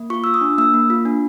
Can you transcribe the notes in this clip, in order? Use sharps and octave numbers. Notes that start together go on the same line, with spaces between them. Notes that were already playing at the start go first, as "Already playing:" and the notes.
Already playing: A#3
F4 C#6
F4 E6
D#6
D4
A#3 E6
A#3
F4
D4